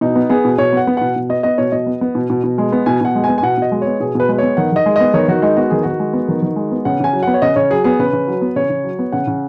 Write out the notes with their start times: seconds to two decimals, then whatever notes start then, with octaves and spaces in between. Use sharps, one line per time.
0.01 B2 D#4
0.16 B3
0.29 B3 G#4
0.45 B2
0.58 B2 C#5
0.72 B3 F#5
0.87 B3
0.97 B2 F#5
1.16 B2
1.29 B3 D#5
1.43 B3 D#5
1.58 B2 C#5
1.72 B2 D#5
1.86 B3
2.01 B3
2.15 B2
2.30 B2
2.44 B2
2.58 G#3
2.72 B3
2.86 B2 G#5
3.01 B2 F#5
3.15 G#3
3.24 B3 G#5
3.38 G#5
3.43 B2 F#5
3.58 B2 D#5
3.72 G#3
3.82 B3 C#5
4.00 B2 G#4
4.15 B2 B4
4.29 G#3 B4
4.38 B3 C#5
4.57 D#3 F#5
4.72 D#3 D#5
4.86 G#3
4.96 B3 D#5
5.14 D#3 C#5
5.28 D#3 F#4
5.42 G#3 D#4
5.57 B3 F#4
5.70 D#3 G#4
5.83 D#3 F#4
5.99 G#3
6.13 B3
6.28 D#3
6.42 D#3
6.56 G#3
6.72 B3
6.85 C#3 F#5
7.00 C#3 G#5
7.13 F#3
7.23 B3 F#5
7.34 C#5
7.42 C#3 D#5
7.56 C#3 C#5
7.70 F#3 G#4
7.84 B3 G#4
7.99 C#3 B4
8.13 C#3
8.28 F#3
8.42 B3
8.56 C#3 C#5
8.70 C#3
8.84 F#3
8.99 B3
9.12 C#3 F#5
9.27 C#3